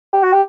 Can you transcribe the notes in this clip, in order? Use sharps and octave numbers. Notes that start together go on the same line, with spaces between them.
G4
F#4
G4